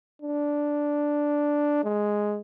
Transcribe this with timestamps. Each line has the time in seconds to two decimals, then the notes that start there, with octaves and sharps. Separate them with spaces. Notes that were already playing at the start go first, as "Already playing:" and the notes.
0.22 D4
1.84 G#3